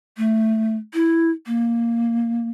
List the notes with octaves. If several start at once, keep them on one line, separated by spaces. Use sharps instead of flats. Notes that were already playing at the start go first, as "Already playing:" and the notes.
A3
E4
A#3